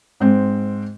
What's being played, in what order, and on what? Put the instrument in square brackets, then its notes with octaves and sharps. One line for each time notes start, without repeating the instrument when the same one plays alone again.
[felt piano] G#2 C4